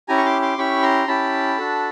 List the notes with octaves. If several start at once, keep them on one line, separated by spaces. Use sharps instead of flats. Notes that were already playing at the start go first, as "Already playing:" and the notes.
C#4 E4 G4 G#5 A#5
C#6
C6 D6
C6 D6
C#4 E4 G4 B5 C#6
A#5 C6
C#4 E4 G4 A5 B5
D4 F#4 A4